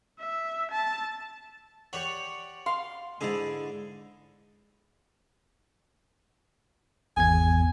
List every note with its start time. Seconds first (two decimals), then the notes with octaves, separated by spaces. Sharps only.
0.19 E5
0.72 A5
1.93 G4 C#5 D5 F#5
2.66 F5 C6
3.21 G#2 D3 E4 G#4 D5 G#5
7.17 G#1 E2 G#5 G#6